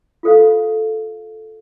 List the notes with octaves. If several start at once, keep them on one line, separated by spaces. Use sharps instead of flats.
F4 A4 C5 F5